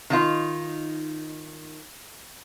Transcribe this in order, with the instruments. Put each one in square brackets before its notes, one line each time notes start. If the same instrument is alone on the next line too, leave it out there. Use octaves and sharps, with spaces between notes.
[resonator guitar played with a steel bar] D#3 D#4 F4